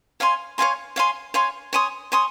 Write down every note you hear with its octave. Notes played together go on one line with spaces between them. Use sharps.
C#5 F5 G#5 C6
C#5 F5 G#5 C6
C#5 F5 G#5 C6
C#5 F5 G#5 C6
C#5 G#5 C6 D#6
C#5 G#5 C6 D#6